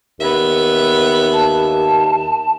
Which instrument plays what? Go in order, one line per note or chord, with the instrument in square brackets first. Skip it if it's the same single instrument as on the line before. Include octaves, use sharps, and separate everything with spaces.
[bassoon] D#2 [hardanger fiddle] B3 E5
[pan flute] A5